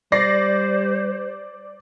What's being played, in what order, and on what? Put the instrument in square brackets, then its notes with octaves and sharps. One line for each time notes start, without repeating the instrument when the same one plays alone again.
[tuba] G3 [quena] C5 [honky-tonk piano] D5 A#6 C7